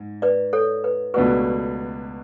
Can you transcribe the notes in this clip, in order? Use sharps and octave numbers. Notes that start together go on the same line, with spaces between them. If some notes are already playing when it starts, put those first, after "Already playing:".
Already playing: G#2
B4 D5
A4 C#5
B4
C#2 B2 A3 D4 F#4 B4